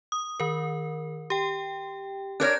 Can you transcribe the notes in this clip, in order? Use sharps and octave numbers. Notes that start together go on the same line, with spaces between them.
D#6
D#3 A#4
G4 G5
D4 A#4 C#5 F#6 G6 A#6